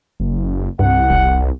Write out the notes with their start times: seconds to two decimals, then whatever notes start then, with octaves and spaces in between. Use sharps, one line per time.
0.20 F#1
0.79 C2 G2 F#5
1.10 E1